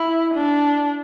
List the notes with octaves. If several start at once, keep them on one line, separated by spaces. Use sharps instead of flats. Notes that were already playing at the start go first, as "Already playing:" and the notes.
Already playing: E4
D4